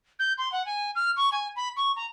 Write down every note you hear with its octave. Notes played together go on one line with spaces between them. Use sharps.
G6
C6
F#5
G#5
F6
C#6
G#5
B5
C#6
A#5